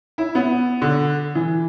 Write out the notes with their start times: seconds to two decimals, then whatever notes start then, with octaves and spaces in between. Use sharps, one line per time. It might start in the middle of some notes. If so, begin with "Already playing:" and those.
0.18 E4
0.35 B3
0.82 D3
1.35 E3